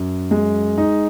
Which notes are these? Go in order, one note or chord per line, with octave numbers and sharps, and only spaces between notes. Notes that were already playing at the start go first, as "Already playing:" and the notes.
Already playing: F#2
G#3
D#4